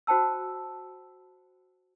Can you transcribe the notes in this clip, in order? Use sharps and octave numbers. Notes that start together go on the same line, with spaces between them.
F#4 C5 G5 A5 E6